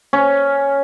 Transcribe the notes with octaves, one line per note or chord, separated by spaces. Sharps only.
C#4